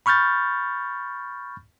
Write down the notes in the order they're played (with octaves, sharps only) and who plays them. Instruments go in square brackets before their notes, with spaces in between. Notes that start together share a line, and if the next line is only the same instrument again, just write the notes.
[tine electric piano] B5 C#6 F6 G6 A6